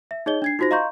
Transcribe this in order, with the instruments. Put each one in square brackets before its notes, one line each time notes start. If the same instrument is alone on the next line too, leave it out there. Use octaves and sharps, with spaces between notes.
[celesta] E5
D#4 G#4 C#5 D#5 G7
D4 G#6 C7
D#4 F4 F#4 C5 A#6
D#5 F5 A#5 C6 C#6 G6